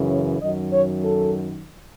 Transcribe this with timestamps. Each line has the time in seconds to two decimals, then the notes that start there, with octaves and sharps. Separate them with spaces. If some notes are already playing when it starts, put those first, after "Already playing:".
Already playing: F#2 C#3 E3
0.08 C#5
0.40 F#2 D#3 F#3 D#5
0.72 C#5
1.03 A4